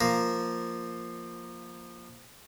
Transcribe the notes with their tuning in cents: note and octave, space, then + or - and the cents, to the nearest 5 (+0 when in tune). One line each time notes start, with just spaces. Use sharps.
F3 +0 A#3 +0 A#4 +0